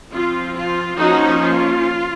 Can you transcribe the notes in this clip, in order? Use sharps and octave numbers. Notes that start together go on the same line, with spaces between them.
F3 C4 F4
F4
F3 A#3 C#4 D#4 F#4
F4